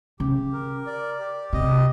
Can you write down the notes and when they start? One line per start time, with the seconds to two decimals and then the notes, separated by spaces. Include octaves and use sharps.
0.20 C#3 G4
0.53 A#4
0.86 D5
1.19 G4
1.53 C3 D#5